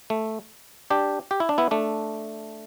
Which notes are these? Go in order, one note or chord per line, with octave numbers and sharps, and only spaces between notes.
A3
D4 G4
G4
E4
D4
B3 E4
A3 D4